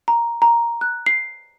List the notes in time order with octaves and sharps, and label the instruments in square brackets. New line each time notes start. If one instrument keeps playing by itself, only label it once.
[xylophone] A#5
A#5
F#6
C7